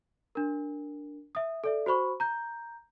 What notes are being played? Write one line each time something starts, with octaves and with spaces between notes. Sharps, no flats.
D4 A#4
E5 D#6
A4 D5 E5
F#4 C5 B5 C#6
A#5 G6